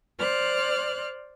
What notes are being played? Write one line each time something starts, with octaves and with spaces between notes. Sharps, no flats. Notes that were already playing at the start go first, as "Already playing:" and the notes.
C5 D5 F6 F#6